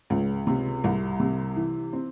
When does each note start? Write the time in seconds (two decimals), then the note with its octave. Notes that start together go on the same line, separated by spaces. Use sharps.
0.10 C#2
0.47 C3
0.84 C2
1.20 C3
1.56 E3
1.93 C4